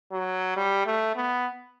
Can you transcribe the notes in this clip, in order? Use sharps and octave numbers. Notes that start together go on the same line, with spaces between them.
F#3
G3
A3
B3